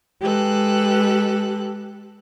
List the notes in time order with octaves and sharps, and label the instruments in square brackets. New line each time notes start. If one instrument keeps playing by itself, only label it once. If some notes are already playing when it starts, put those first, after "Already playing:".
[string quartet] G#3 G4 A4 B4 F#6